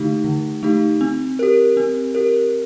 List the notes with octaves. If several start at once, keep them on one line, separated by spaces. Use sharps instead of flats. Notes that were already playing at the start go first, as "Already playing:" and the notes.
Already playing: D3 A3 D#4 G4
D3
A3 D#4 G4
C4
G4 A#4
C4
G4 A#4